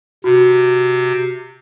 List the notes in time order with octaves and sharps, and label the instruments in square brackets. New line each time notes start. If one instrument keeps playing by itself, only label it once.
[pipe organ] C3 [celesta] F#4